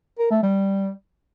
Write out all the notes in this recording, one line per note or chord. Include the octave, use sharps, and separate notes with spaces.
A#4
A3
G3